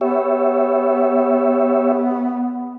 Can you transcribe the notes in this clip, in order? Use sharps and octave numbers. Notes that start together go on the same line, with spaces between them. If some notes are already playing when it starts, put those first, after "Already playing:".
B3 G4 C#5 E5